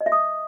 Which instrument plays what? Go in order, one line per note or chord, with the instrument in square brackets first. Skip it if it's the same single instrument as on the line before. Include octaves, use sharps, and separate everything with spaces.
[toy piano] D#5
E5
D#6